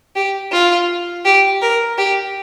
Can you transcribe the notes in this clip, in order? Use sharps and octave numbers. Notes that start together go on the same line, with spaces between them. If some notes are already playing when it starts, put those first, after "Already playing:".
G4
F4
G4
A#4
G4